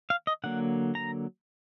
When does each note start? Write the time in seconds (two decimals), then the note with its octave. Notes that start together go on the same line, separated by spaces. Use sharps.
0.10 F5
0.27 D#5
0.44 D3 F#3 A#3 F#5
0.95 A#5